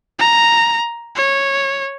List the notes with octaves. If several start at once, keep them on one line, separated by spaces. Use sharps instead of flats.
A#5
C#5